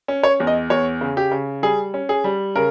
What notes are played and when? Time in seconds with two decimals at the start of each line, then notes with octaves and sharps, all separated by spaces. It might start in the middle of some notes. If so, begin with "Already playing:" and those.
0.08 C#4
0.23 C#5
0.40 E2
0.47 D#5
0.70 E2 C#5
1.01 C#3
1.17 G4
1.31 C#3
1.63 G3 G#4
1.94 C#4
2.09 G#4
2.24 G3
2.56 C#3 A#4